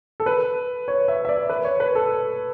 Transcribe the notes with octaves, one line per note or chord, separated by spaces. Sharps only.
A4
B4
C#5
E5
E5
D5
B4
C#5
B4
A4